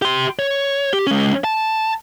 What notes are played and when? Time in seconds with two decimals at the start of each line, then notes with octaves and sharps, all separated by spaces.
0.02 G4 C6
0.39 C#5
0.93 G4
1.07 G#3 C#4
1.44 A5